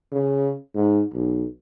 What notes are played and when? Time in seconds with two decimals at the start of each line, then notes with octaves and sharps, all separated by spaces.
0.12 C#3
0.75 G#2
1.13 B1